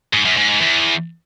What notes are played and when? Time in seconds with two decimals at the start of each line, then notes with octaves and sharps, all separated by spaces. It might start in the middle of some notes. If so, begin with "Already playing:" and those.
0.13 G#2
0.25 F#2
0.37 G#2
0.49 G#2
0.61 E2